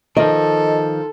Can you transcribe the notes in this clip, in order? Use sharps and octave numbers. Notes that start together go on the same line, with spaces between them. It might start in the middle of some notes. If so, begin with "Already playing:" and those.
D#3 F3 A4 D#5